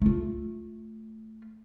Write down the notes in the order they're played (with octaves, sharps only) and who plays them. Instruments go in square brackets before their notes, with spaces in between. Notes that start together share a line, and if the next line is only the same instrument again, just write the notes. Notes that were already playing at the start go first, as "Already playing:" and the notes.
[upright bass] A3 F4